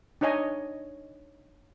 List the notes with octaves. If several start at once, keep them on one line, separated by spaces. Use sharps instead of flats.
D4 D#4 C#5 D#5 G#5